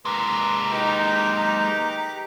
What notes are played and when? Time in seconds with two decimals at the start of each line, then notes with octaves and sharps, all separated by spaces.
0.05 G#3 A#3 B4 A#5
0.72 D#4 G4 B4 D6